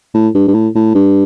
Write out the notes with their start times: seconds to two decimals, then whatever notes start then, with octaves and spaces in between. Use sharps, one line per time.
0.14 A2
0.35 G2
0.48 G2
0.54 A2
0.75 A2
0.95 G2